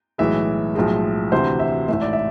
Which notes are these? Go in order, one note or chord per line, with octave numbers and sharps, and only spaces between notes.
B1 A2 E3 G#3 E5
B1 A2 F3 G#3
D2 C3 E3 C5
E5
A1 G#2 E3 A3 E5
D5
E5